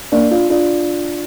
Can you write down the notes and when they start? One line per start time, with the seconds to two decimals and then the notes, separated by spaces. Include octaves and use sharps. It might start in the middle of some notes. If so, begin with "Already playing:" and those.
0.12 A#3 D4
0.31 D4 F4
0.50 D4 F4